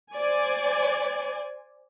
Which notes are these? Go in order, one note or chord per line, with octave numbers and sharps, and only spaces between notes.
C5 D5 G#5